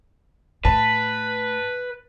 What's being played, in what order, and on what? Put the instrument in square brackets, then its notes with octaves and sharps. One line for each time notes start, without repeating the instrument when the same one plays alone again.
[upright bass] A2 [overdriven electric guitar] B4 [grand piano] A5